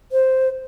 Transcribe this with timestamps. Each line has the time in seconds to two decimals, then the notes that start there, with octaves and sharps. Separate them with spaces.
0.12 C5